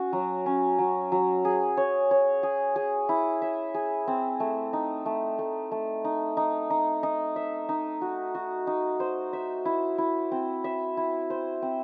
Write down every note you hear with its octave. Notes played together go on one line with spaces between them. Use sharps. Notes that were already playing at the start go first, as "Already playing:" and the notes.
Already playing: C#4 F#4
F#3
C#4
F#3
F#3
G#4
C#5
C#5
G#4
G#4
E4
E5
G#4
C4
A3
D#4
A3
A3
A3
D#4
D#4
D#4
D#4
E5
D#4
F#4
F#4
D#4
C5
E5
E4
E4
C4
E5
E4
C5
C4